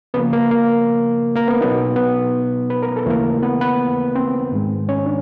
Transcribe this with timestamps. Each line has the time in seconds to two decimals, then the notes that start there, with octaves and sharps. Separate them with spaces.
0.14 C#3 F3 A#3 B3 B4
0.33 A#3 A#4
0.51 A#3 A#4
1.36 A#3 A#4
1.48 B3 B4
1.61 B2 F#3 B3 D#4
1.96 B3 B4
2.70 B4
2.83 A#4
2.96 A4
3.06 D#2 C#3 E3 A3 A#3 A#4
3.42 B3 B4
3.61 B3 B4
4.15 C4 C5
4.52 G#2 D#3 G#3
4.89 C#4 C#5
5.06 D4